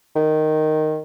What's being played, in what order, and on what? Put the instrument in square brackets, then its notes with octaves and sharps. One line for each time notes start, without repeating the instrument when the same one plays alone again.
[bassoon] D#3